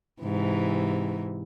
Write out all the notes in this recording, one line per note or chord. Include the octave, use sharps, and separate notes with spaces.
G#2 C3 E3